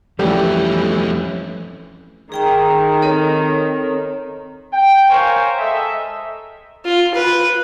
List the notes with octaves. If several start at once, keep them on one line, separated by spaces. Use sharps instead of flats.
F2 E3 G3 A3 C#4 G4
D#3 G#4 G5 A#5
C4 A4 C#5
G5
A#4 C5 C#5 F5 G#5 A#5
G#3 A4 D#5 E5
F4
B4